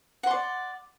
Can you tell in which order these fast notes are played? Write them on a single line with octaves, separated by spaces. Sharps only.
F#5 C6 D5